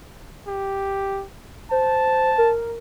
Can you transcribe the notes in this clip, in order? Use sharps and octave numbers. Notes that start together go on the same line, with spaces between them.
G4
C5 A5
A#4